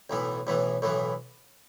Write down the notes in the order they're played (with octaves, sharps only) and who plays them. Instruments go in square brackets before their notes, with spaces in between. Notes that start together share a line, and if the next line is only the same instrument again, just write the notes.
[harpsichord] B1 A2 E3 B3
B1 A2 E3 B3
B1 A2 E3 B3